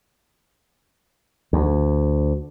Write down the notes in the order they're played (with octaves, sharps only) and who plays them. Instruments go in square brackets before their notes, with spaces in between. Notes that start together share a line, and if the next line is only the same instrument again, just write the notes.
[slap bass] D2